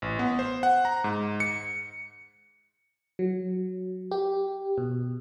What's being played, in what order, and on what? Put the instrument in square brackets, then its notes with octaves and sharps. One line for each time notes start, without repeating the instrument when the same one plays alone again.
[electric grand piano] A1
B3
C5
F#5
A#5
G#2
C#7
[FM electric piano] F#3
G4
B2